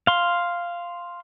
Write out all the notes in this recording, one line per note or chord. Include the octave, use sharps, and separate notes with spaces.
F5 C6